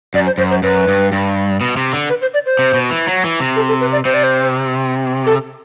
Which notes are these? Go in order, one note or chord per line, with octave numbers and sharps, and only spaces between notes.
F#2 D5
C5
F#2 C5
C5
F#2 B4
G2
G2
B2
C3
D3
B4
C5
D5
C5
C3
B2
E3
F#3
E3
C3
A4
A4
B4
D5
C3 C5
D5
C5
A4